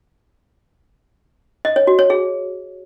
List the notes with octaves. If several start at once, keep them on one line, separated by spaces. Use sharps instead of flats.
D#5
C#5
F#4
C#5
G#4